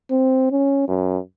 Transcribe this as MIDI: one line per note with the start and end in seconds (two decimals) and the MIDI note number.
0.11 0.48 60
0.51 0.86 61
0.88 1.18 42